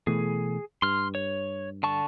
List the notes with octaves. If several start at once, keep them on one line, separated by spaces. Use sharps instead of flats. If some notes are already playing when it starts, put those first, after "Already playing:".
B2 E3 A3 G#4
G2 C6 F6
C#5
D3 A5 C#6